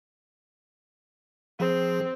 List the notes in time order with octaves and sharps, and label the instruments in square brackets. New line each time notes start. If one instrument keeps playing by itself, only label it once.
[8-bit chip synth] F3 G#4 [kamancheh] C4